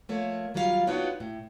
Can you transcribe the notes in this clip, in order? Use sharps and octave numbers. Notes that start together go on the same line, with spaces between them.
F3 A3 A#3 C#5
D#2 F#3 G3 F4 G#4 F5
B3 D4 D#4 F4 F#4 C#5
A2